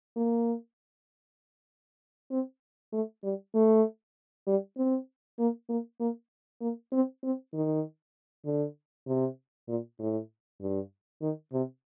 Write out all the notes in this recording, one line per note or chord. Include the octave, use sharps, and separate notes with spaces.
A#3
C4
A3
G3
A3
G3
C4
A#3
A#3
A#3
A#3
C4
C4
D#3
D3
C3
A#2
A2
G2
D#3
C3